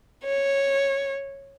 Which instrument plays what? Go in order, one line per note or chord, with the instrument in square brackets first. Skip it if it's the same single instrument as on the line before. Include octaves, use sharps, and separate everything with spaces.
[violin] C#5